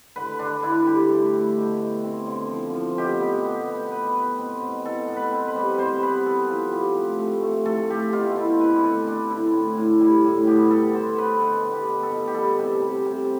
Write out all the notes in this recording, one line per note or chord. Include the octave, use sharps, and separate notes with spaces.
D3 B4
D3 D4
D3 E4
G3 G4
A3
A3
B2
B2
C4
D3
F3
F3
B2 G4
B3
B3
B3
B2 B4
B2
C4
B2
B2 A4
B2
B4
C4
B4
G3
C3 C5
B3 B4
B3 A4
F3 F4
C3 G4
A3
A3
A3
A3 A4
A3 G4
B2 F4
C4 E4
D3 B4
A3 A4
D3 D4
D3 E4
A2
A2
G3
A2
B3 G4
B3 A4
B3 C5
D3 B4
B2 A4
B2
G4
B3
A4
B2
G4
G3 A4
C3
C3
C3